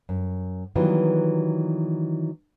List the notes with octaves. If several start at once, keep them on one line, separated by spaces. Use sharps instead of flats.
F#2
D#3 E3 F#3 G3 B3 F4